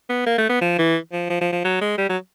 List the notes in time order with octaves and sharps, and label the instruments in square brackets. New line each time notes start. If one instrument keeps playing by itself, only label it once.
[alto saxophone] B3
A#3
A3
B3
F3
E3
F3
F3
F3
F3
F#3
G#3
G3
F#3